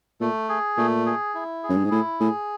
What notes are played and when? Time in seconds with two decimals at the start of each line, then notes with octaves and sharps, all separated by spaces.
0.20 A#2 A3
0.49 G#4
0.77 A#2 A3
1.06 G#4
1.35 E4
1.63 G#4
1.69 F#2
1.77 G2
1.84 G#2
1.91 A2 E4
2.20 A2 G#4